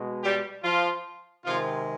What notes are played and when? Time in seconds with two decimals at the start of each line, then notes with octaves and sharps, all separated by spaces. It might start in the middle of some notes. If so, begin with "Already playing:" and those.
Already playing: B2 G#3
0.23 G3 G4
0.63 F3 F4
1.45 C3 D#3 F3 G#3 F4